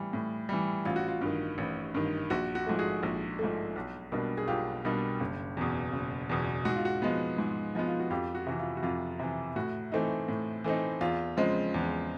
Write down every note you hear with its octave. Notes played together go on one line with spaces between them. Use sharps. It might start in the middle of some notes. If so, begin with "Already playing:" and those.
Already playing: A2 E3 G3
A2
E3 G3
A1 F4
F#4
F4
G2 D#3
A1
G2 D#3
A#1 F#4
F#4
G#2 F3 A3
F#4 G#4
A#1
G#2 F3 A3
B1
B2 G3 A#3 D4
G#4
B1 F4 G4
B2 G3 A#3 D4
F#1
E2 B2
F#1
E2 B2
G#2 F#4
F4
F#4
F3 G#3 B3
G#2
F3 G#3 B3
F4
F#4
F2 F4 G4
F#4
C3 E3 F#4
F4
F#4
F2 F4
C3 E3
A2 F#4
E3 A3 C4 D#4
A2
E3 A3 C4 D#4
E2 F4
C#3 F3 G#3 C4
E2